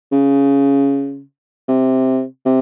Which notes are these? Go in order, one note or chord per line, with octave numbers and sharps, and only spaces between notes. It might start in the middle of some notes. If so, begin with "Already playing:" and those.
C#3
C3
C3